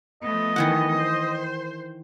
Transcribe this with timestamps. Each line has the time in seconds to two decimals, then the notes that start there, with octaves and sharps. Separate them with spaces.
0.23 F3 A3 B3 D#5
0.56 D#3 E3 F#5
0.99 C5